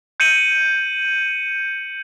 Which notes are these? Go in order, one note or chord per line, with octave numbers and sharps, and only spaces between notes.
G6 C#7 D#7 F#7